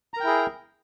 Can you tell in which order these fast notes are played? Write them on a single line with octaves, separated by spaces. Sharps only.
A#5 A#4 G5 E4 G#4